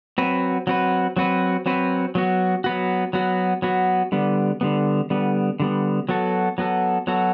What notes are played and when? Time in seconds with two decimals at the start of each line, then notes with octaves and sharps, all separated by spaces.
0.18 F#3 C4 F#4 B4
0.67 F#3 C4 F#4 B4
1.17 F#3 C4 F#4 B4
1.66 F#3 C4 F#4 B4
2.15 F#3 B3 F#4
2.64 F#3 B3 F#4
3.13 F#3 B3 F#4
3.62 F#3 B3 F#4
4.12 D3 G3 B3
4.61 D3 G3 B3
5.10 D3 G3 B3
5.60 D3 G3 B3
6.09 F#3 B3 F#4 A4
6.58 F#3 B3 F#4 A4
7.07 F#3 B3 F#4 A4